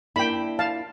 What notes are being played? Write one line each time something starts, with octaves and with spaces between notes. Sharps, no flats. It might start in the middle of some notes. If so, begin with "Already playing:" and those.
A#3 D4 E4 G5 B5
F5 A5